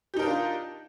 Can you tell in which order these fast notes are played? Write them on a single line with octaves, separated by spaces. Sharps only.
G4 D#4 A#4 D4 F4